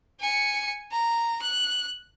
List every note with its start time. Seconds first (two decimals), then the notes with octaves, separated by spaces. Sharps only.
0.20 G#5 C#7
0.91 A#5
1.42 F#6